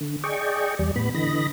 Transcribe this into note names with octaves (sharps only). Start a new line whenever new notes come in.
D3
G#4 D5 D#5 G5 C#6
E2 G3 D5
A2 B3 B5
D3 E3 D#5 B5 A#6